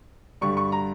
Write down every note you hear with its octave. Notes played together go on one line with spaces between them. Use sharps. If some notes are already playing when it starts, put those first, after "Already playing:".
G2 D3 G3 C#6
C#6
A#5